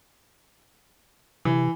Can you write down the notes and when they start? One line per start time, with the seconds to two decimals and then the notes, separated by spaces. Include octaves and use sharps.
1.45 C3 E3